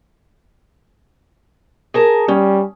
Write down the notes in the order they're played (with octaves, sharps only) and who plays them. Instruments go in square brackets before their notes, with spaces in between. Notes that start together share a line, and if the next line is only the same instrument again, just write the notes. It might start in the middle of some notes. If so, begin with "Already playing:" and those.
[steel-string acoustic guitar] G#4 A#4 A5
[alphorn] G3 [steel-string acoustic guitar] C#4